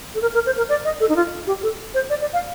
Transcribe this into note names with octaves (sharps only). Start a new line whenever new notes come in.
A4
A#4
A#4
C5
A#4
D5
D#5
A4
D#4
F4
G4
A4
C5
D5
D5
F5